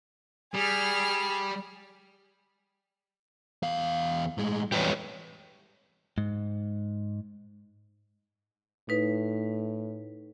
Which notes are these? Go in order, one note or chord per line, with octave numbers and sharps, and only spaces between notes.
G3 G#4 F6
E2 F5
A2 G#3
E2 G3 G4 B4 C#5
G#2
A2 D#4 B4